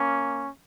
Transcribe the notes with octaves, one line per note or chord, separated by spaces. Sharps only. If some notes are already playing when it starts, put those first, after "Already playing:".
Already playing: A#3 C#4